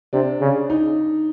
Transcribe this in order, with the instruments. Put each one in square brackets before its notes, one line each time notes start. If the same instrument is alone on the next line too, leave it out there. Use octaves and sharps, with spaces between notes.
[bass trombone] C3 [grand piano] D4
[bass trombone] C#3
[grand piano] D#4